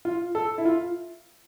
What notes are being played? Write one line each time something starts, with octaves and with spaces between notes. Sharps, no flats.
F4
A4
E4
F4